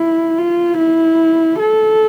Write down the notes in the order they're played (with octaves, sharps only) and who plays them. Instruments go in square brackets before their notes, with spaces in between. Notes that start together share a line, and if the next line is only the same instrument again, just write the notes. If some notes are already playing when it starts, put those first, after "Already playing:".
Already playing: [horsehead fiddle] E4
F4
E4
A4